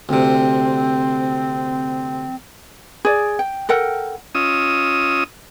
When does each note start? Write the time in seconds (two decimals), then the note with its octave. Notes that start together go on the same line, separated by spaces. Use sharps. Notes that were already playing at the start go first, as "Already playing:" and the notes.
0.09 D2 C3 C4
3.05 G#4 D5
3.39 G5
3.69 A4 A#4 F#5 G5
4.35 C#4 F4 D#5 D#6 E6